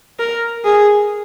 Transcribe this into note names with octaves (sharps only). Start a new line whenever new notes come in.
A#4
G#4